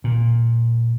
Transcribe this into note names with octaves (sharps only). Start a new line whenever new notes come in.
A#2